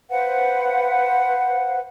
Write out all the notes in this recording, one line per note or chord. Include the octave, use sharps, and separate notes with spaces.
B4 C5 F5 F#5